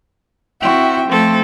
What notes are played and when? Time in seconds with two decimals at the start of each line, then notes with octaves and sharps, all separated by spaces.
0.60 C4 E4 F#4 E5 G5
1.08 F3 A3 C4 A4